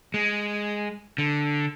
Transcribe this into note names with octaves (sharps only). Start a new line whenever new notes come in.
G#3
D3